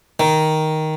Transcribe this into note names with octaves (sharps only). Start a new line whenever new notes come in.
D#3